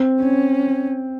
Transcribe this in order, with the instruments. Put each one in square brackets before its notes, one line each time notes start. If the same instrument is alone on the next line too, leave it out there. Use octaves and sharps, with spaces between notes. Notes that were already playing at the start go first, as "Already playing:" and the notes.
Already playing: [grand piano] C4
[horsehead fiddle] C#4